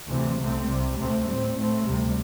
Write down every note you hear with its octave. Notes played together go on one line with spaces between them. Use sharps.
D2 C3 E3 C4
C2 C3 A3 C4
C2 C3 G3
D2 C3 A3 C4
A2 G3 C4
A2 A3 C4
D2 C3 G3